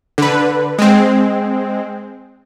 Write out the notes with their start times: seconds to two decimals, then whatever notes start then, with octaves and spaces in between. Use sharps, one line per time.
0.18 D3 B4
0.79 G#3 C4